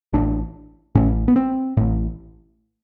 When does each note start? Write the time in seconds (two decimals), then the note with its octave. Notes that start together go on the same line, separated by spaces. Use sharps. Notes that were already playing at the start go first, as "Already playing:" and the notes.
0.13 A1 A2 D4
0.95 A1 A2 C#4
1.28 B3
1.36 C4
1.77 A1 A2